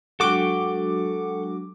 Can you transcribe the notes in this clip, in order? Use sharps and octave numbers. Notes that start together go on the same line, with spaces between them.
F#3 G#3 D4 F#4 A4 G5 D6